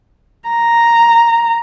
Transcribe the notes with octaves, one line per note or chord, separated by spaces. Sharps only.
A#5